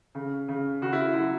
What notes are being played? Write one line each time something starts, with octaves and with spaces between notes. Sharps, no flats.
C#3
C#3
C#3 F#4
E4
F#3 E4